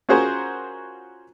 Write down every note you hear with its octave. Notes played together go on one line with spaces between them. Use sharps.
C#4 F4 F#4 G#4 A#4 C5